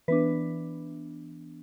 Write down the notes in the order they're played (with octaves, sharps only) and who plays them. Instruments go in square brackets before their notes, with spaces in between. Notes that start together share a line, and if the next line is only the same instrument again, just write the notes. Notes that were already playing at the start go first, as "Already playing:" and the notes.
[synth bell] E3 B3 D4 B4